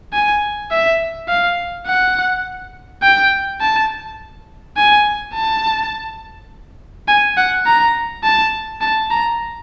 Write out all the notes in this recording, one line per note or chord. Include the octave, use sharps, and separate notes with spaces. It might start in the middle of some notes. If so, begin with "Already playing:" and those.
G#5
E5
F5
F#5
G5
A5
G#5
A5
G#5
F#5
A#5
A5
A5
A#5